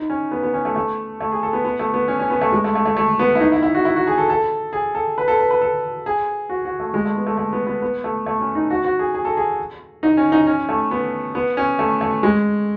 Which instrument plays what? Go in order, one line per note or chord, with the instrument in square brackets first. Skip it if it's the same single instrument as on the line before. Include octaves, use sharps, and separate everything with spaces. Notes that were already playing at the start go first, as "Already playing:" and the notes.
Already playing: [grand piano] D#4
C#4
B3
B3
C#4
A3
A3
A3
G#4
A4
B3
B3
A3
B3
C#4
C#4
B3
A3
G#3
A3
A3
A3
A3
B3
E4
D#4
E4
E4
F#4
E4
F#4
G#4
A4
A4
G#4
A4
B4
A4
B4
B4
A4
G#4
F#4
F#4
A3
G#3
A3
B3
A3
A3
B3
B3
B3
A3
A3
C#4
D#4
F#4
F#4
G#4
G#4
A4
G#4
D#4
C#4
D#4
C#4
A3
B3
B3
C#4
A3
A3
G#3